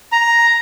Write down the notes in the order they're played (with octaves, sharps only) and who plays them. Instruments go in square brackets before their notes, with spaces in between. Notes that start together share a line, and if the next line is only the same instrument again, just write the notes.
[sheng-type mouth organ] A#5